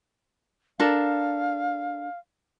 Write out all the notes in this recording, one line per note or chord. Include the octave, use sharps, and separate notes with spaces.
D4 A4 A#4 F5